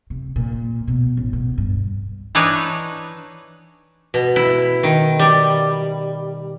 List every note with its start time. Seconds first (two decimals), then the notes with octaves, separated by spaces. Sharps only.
0.10 C3
0.36 A#2
0.88 B2
1.17 A1
1.33 B2
1.58 G2
2.35 E3 D4 D#4 B4 C#5
4.14 B2
4.36 E4
4.83 D#3
5.19 G3